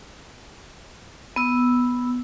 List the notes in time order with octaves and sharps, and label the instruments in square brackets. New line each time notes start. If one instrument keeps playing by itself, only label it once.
[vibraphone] B3 E6